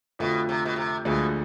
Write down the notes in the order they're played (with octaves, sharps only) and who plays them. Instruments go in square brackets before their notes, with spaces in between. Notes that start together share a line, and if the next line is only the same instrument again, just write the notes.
[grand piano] F2 D3 F3 A3 [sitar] B2
[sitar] C3
B2
C3
[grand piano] D2 D3 F3 G#3 [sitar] B2